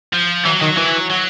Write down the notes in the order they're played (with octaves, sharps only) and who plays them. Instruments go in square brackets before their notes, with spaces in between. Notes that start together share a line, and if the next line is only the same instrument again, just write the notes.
[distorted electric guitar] F3
[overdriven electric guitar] E3 [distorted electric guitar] F#3
[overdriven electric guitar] D#3
E3
[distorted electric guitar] F#3